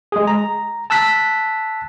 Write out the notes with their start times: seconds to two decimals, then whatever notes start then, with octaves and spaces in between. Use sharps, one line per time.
0.12 G#3 G#4
0.27 A#5
0.90 A5 E6 F#6 B6